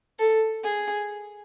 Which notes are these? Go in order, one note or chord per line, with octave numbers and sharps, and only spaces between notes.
A4
G#4